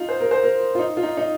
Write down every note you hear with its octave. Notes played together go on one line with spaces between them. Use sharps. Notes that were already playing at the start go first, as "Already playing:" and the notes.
Already playing: D#4 F4
C5
A#4
C5
A#4
F4
D#4
F4
D#4
D#4